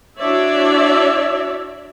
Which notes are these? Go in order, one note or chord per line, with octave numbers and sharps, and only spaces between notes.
D4 E4 F#4 C#5 D5 E5